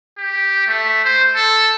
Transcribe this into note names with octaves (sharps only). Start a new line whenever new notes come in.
G4
A3
C5
A4